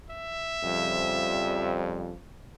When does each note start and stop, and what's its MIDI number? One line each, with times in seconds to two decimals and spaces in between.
0.10 1.77 76
0.63 2.11 41
0.63 2.14 49
0.63 2.14 53
0.63 2.14 55